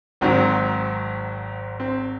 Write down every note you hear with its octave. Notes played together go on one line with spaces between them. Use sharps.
G#1 G#2 D#3 F#3 C4
C4